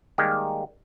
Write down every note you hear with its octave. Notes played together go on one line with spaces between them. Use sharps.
D#3 G3 G#3 A#3 G4